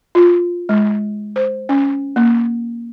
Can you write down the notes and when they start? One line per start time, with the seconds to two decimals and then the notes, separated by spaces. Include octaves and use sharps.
0.15 F4
0.69 G#3
1.36 C5
1.69 C#4
2.16 A#3